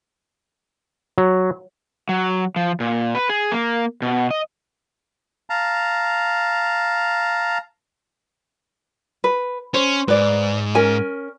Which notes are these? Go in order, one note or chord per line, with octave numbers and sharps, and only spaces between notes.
F#3
F#3
F3
A#2
B4
G#4
A#3
B2
D#5
F5 A5 A#5
B4
C#4 C5
G#2 B4 D5
C#4 A#4 G#5